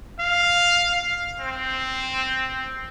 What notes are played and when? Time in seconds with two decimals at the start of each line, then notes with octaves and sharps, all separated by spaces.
0.19 F5
1.40 C4